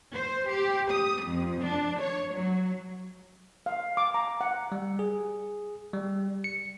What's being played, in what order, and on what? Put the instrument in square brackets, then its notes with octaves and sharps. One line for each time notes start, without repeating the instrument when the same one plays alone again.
[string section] C5
G4
D#6
F2
D4
C#5
F#3
[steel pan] F5
D6
A#5
F#5
[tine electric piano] G3
G#4
G3
C#7